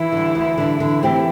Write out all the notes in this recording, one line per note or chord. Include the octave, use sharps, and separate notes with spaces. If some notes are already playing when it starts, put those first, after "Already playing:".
Already playing: E3 E4
D3 G3
D2
D3 G3
D3 E3 E4
A3 C4 G4